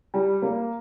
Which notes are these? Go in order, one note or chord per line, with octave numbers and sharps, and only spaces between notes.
G3
A#3